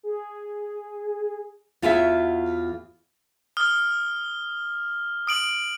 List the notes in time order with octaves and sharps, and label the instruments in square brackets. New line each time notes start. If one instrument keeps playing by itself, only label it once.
[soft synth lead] G#4
[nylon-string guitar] E2 F4 F#4 G#4 C#5 E5
[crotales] D#6 F6 G7
D#6 D7 F#7